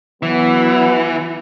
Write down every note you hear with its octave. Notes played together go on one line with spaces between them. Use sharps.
E3 F#3 B3